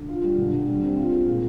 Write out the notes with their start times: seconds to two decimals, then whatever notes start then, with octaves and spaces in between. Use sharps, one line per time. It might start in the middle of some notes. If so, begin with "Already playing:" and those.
Already playing: D3
0.09 F4
0.24 G3
0.38 D3
0.53 D3
0.67 G3
0.82 C4
0.97 F4
1.12 G#3
1.26 A#2